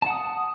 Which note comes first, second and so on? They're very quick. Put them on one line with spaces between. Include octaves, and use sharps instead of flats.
A5 F#5 D#6